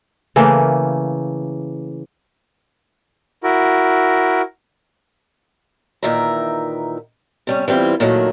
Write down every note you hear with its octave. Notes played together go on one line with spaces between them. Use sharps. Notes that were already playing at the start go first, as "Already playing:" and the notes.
C#3 E3 A3 A#3
E4 F#4 A#4
A#2 D#3 E3 E5 A#5
C3 G3 C#4
E3 G3 C4 E4 F4
A#2 D#3 F#3 A3